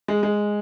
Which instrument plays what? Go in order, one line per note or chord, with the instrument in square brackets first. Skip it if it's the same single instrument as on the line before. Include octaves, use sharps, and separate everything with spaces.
[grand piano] G#3
G#3